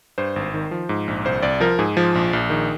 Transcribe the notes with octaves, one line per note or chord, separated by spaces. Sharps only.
G2 C5
G#1
D#3
F3
G#2
A#1
C2 C5
C2 D5
F3 A#4
G#2 G#4
F3
A#1
A#1
D#3